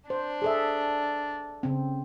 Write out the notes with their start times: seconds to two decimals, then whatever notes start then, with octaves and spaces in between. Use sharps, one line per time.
0.10 D4 C5
0.42 G#4 A4 E5
1.63 C#3 C4